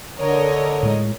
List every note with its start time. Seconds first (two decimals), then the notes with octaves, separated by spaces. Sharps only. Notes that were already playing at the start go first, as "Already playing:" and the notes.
0.20 D3 A#4 C#5 D#5
0.83 A2 G#3